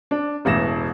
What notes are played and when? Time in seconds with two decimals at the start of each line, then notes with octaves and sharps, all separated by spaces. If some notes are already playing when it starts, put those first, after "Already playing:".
0.11 D4
0.45 E1 A1 A#6 E7